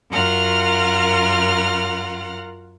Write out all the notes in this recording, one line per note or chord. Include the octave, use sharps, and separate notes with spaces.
F#2 F4 A#4 F#5 F6